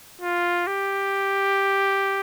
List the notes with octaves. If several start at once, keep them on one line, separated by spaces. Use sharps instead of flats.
F4
G4